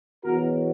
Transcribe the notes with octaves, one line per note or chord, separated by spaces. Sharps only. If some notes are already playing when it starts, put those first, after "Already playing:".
E2 B2 F#3 F#4 A#4